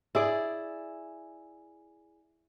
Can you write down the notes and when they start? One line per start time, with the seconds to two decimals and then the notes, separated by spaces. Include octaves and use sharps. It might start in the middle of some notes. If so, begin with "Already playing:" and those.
0.15 E4 G#4 D5